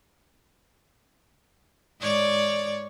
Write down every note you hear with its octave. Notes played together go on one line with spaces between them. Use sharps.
G#2 C#5 D5